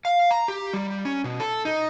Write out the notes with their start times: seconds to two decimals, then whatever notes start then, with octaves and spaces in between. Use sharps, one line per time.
0.05 F5
0.31 A#5
0.48 G4
0.73 G3
1.05 C#4
1.24 B2
1.40 A4
1.65 D#4